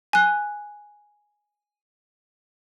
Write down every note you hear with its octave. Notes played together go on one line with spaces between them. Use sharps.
G#5 F#6